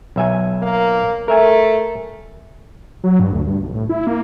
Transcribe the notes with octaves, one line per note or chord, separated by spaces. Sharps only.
B1 E5 G#5
A#3
A3 A#4 E5 G#5
F#3
G2
D2
G2
B1
A2
E4
A#3